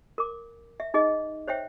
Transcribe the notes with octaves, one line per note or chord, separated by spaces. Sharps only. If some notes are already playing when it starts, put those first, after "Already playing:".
A#4 D6
E5
D#4 G#4 D#5
C5 C#5 E5 G5